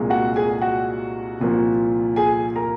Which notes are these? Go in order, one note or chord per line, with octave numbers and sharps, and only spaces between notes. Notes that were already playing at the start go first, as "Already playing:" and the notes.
Already playing: C2 A#2 G#3
F#4 F#5
G#4 G#5
F#4 F#5
C2 A#2 F3
G#4 G#5
A#4 A#5